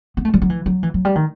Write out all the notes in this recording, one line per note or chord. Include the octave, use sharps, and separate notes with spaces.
B3
A3
G3
F#3
E3
F#3
E3
F#3
G3
D#3